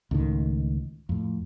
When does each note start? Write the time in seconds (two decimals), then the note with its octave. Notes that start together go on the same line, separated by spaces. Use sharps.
0.11 C#2 A2 D#3
1.09 F2 A2